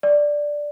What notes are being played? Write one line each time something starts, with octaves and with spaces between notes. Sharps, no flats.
D5